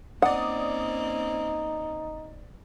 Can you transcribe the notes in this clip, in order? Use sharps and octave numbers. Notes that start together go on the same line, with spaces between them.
A#3 C4 C#4 D#4 D5 F#5 D#6